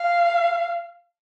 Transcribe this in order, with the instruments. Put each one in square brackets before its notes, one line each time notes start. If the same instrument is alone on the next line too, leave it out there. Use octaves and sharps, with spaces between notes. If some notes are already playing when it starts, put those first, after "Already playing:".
Already playing: [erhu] F5